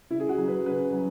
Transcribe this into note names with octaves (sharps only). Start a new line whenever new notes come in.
C#3 E4
G#4
F#4
F#3 C#4
B4
C#3 B4
F#3